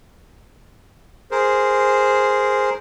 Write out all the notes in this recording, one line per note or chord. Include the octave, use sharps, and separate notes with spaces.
G#4 A#4 C5